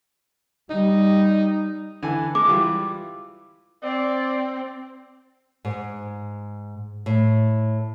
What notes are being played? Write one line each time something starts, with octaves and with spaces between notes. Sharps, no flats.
G3 D#4
D3 E3 G#5
G#3 D6
E3 G3 F4
C4 D5
G#2
A2